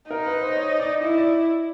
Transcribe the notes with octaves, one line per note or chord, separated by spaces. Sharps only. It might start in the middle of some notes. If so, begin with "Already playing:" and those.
D#4 A#4
B4
C5
C#5
D5
E4 D#5
D5